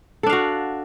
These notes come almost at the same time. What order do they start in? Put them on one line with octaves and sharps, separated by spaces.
A4 D4 F5 F#4